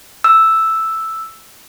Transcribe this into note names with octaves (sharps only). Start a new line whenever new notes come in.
E6